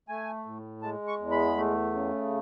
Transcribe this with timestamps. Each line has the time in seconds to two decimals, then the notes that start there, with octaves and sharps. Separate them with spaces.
0.09 A3 G#5
0.46 A2
0.82 G#3 A5
1.07 C#6
1.19 E2
1.31 B5
1.57 A3
1.93 C#3